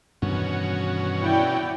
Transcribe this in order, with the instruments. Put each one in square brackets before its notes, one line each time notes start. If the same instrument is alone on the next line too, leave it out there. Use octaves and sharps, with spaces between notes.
[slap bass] G2 D#3 E3 [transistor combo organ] B2 C#4 F#4
[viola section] E4 D5 G5